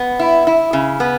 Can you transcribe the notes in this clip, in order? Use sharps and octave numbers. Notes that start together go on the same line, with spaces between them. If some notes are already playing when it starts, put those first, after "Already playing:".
Already playing: B3
E4
E4
C#3
B3